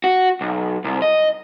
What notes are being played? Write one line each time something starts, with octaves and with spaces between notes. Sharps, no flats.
F#4
B1
C2
D#5